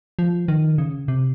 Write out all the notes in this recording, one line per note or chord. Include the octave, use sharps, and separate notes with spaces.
F3
D#3
C#3
C3